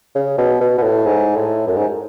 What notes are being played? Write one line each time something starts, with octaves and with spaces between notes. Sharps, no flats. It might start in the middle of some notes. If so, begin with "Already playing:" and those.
C#3
B2
B2
B2
A2
G#2
A2
F#2
G#2